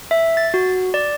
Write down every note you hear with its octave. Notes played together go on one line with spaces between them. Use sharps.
E5
A6
F#4
D5